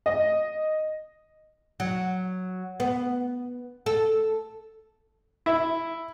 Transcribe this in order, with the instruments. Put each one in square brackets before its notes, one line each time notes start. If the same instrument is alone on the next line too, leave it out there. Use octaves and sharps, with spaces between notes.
[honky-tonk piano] D#5
[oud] F#3
B3
A4
[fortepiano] E4